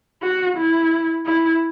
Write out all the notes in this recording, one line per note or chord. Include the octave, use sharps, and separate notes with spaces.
F#4
E4
E4